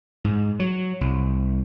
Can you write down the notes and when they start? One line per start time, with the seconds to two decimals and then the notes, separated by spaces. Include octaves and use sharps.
0.24 G#2
0.60 F#3
1.01 C2